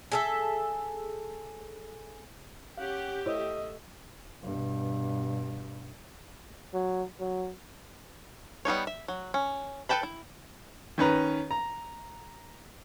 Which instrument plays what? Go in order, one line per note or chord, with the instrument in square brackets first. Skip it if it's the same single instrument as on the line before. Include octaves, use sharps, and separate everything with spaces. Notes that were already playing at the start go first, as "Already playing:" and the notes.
[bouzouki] G#4 A4 E5
[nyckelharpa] C#4 F#5 [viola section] G4 [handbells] F5
[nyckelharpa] A3 E5 [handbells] E4 C5 C#5 [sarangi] D#5
[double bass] G2 B2
[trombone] F#3
F#3
[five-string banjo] G3 B3 D#4 C#5
E5
F#3
C#4
A4 B4 G5 A5 B5
E4
[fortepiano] D#3 C#4 B4 A#5
A#5